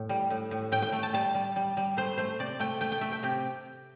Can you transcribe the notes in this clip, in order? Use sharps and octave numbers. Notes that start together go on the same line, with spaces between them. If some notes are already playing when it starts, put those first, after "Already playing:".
Already playing: A2
G3
A2
A2
A2 G5
G5
A3
A5
G3 A5
G3
G3
G3
A3 C5
A3 C5
C3 D5
A3 G5
A3 G5
G5
A3 E5
G5
C3 G4